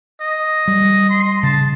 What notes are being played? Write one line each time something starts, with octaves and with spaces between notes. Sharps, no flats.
D#5
G3
C6
C#3 A5